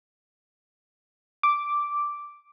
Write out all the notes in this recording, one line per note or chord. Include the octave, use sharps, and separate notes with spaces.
D6